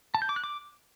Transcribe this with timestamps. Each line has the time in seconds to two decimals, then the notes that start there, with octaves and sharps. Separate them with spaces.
0.15 A5
0.22 G6
0.29 D6
0.36 F#6
0.44 D6